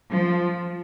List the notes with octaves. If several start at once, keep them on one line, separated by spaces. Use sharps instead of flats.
F3